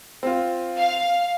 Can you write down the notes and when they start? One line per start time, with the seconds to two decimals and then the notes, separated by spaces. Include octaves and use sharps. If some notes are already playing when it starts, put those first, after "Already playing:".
0.23 C4 F4
0.78 F5